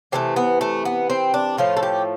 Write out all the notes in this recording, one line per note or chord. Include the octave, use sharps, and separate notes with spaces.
C3 E3 A3 C4
B3
A3
B3
C4
D4
A2 F3 A3 F4
A4
G4